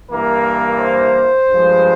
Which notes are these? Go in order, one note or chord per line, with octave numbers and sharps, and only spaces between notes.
G2 E3 A#3 A#4
C5
G2 F3 G#3